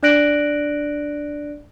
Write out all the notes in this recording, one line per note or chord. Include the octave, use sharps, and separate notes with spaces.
D4 D5 F#6 A#6 D7 F#7